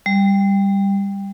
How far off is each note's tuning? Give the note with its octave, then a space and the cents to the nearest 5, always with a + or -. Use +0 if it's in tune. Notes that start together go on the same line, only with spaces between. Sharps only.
G3 +15